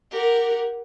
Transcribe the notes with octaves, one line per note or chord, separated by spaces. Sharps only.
G4 A#4 F#5